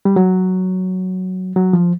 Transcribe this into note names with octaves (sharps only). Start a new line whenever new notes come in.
G3
F#3
F#3
F3